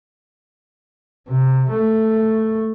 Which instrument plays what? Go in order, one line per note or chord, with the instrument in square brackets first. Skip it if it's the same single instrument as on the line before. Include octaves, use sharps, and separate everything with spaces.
[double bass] C3
A3